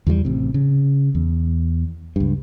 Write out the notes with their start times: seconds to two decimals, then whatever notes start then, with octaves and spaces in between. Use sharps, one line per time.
0.07 E2 E3 F#3 G3
0.25 A1 C3
0.54 C#3
1.15 E2
2.16 C#2 G2